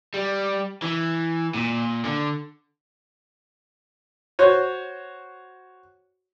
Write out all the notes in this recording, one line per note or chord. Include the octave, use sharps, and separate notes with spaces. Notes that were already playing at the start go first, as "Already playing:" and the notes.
G3
E3
A#2
D3
F#4 C5 C#5